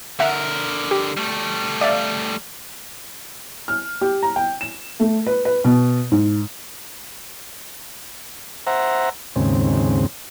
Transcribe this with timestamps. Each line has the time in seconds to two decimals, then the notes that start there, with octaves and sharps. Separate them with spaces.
0.20 D3 A#4 E5 F#5
0.91 G4
1.17 G3 A3
1.81 D5 E5 F5
3.68 F6
4.01 G4
4.23 A#5
4.36 G5
4.61 E7
5.00 A3
5.26 B4
5.45 B4
5.64 B2
6.12 G#2
8.67 C5 E5 F#5 A#5
9.36 D#2 G#2 C#3 C4